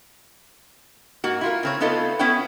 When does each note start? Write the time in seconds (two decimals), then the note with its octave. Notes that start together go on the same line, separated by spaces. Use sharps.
1.24 G#2 A#3 F#4
1.41 E4 F4 A#4
1.63 C#3 C4 C#5
1.80 A3 B3 D#4 F4 A4 B4
2.19 B3 C#4 E4 C#5 F#5 G5